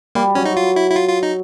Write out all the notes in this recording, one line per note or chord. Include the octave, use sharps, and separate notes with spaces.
G3 A#3
F#3 C#4
D#4
F4
E4
E4
F4
F4
D#4